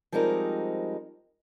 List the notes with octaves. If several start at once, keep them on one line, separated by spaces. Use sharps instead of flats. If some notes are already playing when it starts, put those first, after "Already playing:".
F3 G3 G#3 C4 D#4 A#4